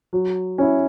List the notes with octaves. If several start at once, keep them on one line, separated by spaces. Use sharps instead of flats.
F#3
C#4 E4